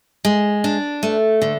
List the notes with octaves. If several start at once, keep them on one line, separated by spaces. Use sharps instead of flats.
G#3
D4
A3
D3